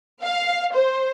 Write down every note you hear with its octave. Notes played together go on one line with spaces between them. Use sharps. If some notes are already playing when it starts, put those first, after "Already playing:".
F5
C5